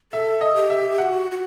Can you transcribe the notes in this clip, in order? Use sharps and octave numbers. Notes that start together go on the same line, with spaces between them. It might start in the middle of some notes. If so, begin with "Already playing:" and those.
A4 E5
D#5
G4
E5
F#4 G4 F#5
F#4